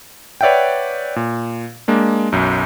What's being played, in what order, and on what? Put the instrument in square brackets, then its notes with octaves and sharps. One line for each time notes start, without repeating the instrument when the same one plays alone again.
[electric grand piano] B4 C#5 D5 E5 F#5 G5
A#2
G#3 A#3 D4
B1 F#2